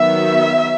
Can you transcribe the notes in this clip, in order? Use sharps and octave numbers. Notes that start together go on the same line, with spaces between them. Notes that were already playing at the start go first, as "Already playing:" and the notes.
Already playing: D#3 F#3 B3 E5